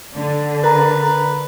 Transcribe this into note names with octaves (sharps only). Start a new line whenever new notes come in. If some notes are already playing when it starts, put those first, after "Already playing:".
D3
A#4 B4 A#5